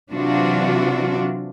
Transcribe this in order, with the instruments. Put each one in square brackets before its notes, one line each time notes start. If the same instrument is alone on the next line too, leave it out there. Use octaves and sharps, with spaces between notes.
[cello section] C3 E3 F#3 D4 F4 F#4